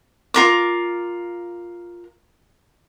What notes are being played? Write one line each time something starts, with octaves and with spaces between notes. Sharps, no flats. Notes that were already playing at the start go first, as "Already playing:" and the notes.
F4 A#4 D6